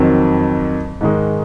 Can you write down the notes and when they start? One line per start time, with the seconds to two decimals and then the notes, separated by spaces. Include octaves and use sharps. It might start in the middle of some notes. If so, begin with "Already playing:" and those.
Already playing: F2 D#3 F#3 C4
1.01 G#2 D#3 G#3 D#4